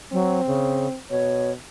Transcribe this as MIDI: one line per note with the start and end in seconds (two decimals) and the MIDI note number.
0.12 0.41 54
0.12 0.98 60
0.47 0.87 49
1.10 1.55 47
1.10 1.52 73